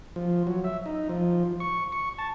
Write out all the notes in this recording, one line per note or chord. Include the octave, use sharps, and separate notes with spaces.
F3
F#3
E5
D#4
F3
C#6
C#6
A5